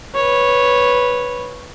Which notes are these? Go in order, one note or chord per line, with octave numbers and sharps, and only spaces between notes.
B4 C#5